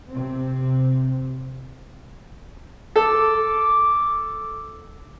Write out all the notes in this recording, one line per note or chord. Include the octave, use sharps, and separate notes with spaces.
C3 C4
A4 D6